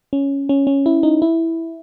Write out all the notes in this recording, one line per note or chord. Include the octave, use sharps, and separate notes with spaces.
C#4
C#4
C#4
E4
D#4
E4